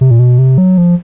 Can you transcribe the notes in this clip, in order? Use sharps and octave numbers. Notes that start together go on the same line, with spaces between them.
C3
A#2
B2
C3
F#3
F3